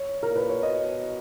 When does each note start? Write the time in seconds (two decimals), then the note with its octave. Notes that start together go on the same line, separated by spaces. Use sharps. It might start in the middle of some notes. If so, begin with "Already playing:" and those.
Already playing: C#5
0.23 A#2 A#4
0.36 B4
0.49 C#5
0.62 B2 D#5